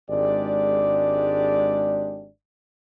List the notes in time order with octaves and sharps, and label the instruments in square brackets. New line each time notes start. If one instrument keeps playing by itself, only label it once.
[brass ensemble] G#1 G#3 D4 G4 D5